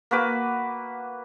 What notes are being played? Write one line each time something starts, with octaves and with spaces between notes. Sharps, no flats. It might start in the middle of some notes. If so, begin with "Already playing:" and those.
A#3 F#4 B4 D6